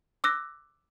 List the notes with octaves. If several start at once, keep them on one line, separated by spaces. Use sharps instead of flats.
D6 E6 F#6 A#6